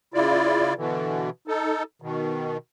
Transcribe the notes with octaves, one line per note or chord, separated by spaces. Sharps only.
C#3 E4 F4 D5
B2 D3 E3
D#4 A4
B2 D#3